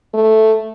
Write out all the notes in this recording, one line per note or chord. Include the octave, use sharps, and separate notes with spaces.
A3